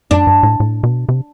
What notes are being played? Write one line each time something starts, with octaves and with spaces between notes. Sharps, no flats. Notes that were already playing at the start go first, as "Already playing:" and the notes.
F#2 D4
G2
A2
A2
B2
C3